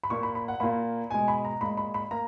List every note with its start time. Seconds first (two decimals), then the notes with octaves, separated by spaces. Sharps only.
0.04 B5
0.10 A#2 A#3 C#6
0.23 B5
0.35 B5
0.48 F#5
0.60 A#2 A#3 B5
1.10 B2 G#3 G#5
1.28 B5
1.45 A#5
1.61 A#2 G#3 B5
1.77 B5
1.94 B5
2.11 A#3 A#5